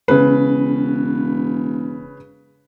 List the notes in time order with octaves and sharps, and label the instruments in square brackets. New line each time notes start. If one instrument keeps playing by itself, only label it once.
[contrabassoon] E1 [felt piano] C#3 B4